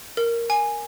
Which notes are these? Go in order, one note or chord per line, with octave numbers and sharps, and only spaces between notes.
A#4
G#5